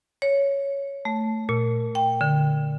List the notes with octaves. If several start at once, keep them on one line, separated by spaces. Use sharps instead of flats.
C#5
A3
A#2
G5
D3